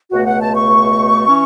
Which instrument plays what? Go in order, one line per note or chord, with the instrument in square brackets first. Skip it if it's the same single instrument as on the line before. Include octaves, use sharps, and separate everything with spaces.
[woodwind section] C#2 B2 A3 [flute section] F#4
[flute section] F#5
A5
C#6
[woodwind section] E3 C#4